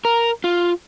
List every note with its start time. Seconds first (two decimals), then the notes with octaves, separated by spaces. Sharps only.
0.05 A#4
0.44 F4